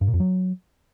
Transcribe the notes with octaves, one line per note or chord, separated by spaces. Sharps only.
G2
A#2
F2
F#3